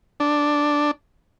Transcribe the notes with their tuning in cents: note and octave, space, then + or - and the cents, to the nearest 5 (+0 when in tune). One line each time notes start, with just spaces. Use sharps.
D4 +0